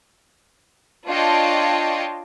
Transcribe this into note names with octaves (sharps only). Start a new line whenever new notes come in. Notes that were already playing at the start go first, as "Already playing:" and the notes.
D4 F4 C#5 D#5 G5 A5